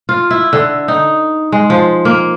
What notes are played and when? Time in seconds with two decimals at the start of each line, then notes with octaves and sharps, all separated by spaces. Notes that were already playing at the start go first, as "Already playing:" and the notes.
0.09 F4
0.31 E4
0.53 D3
0.88 D#4
1.52 G#3
1.70 F3
2.05 A#3